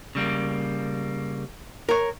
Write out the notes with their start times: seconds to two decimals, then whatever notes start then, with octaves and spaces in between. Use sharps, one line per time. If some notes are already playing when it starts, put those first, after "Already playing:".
0.15 C#3 G3 A#3
1.89 A#4 C#5